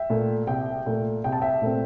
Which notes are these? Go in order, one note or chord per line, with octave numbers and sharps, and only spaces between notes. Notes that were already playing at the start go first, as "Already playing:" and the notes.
Already playing: E5 G5
A#2 A3
C2 E5 G5
A#2 A3
C2 G5
A5
E5 G5
A#2 A3 C4